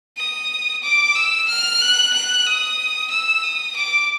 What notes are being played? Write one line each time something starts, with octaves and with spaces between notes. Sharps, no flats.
D#6
D6
E6
F6
F#6
F#6
D#6
E6
D#6
D6